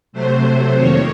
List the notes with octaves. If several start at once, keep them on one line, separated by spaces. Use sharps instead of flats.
C3 F#3 A3 C5
F2 D#3 A#3 C#5